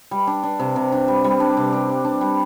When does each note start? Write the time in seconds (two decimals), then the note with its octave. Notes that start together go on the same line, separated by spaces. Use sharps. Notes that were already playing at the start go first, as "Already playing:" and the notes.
0.11 G3
0.27 D4
0.43 D4
0.59 C3
0.76 C3
0.92 D4
1.08 G3
1.24 G3
1.40 D4
1.57 C3
1.72 D4
1.89 D4
2.05 D4
2.21 G3